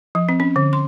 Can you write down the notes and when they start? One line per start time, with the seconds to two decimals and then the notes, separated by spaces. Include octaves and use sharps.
0.15 F3
0.29 C4
0.40 C#4
0.56 D3
0.73 C6